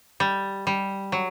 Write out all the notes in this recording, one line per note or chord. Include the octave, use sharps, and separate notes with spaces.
G3
G3
F#3